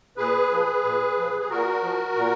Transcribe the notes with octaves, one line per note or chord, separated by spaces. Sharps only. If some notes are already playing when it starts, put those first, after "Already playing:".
A#2 G#4 B4
F3
A#2
F3
G#4
A#2 F#4 A#4
F3
A#2